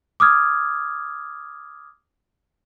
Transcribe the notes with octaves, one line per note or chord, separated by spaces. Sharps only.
D6 D#6 F6 G#6